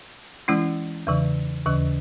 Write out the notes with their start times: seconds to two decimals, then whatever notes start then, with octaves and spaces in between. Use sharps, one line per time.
0.48 E3 G#3 C#4 E4
1.07 E2 C#3 E3
1.66 D#2 C#3 E3